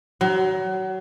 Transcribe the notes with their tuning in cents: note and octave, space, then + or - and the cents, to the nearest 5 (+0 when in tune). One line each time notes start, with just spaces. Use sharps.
F#3 +30